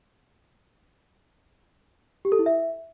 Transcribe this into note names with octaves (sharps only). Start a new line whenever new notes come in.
G4
A4
E4
E5